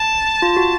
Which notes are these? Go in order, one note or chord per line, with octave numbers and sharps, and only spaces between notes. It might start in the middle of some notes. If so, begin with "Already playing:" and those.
Already playing: A5
F4
F#4